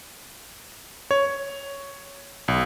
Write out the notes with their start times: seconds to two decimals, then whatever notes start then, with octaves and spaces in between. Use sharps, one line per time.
1.11 C#5
2.48 B1